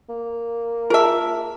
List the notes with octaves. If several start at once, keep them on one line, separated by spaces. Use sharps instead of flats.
A#3
F4 G#4 A#4 E5 A5